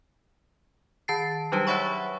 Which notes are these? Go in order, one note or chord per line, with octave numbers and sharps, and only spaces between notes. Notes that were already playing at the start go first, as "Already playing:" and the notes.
D#3 A5 A6 C7
F#3 G3 D4 D#4 G4 B4
B4 C#5 E5 F#5 B5 C#6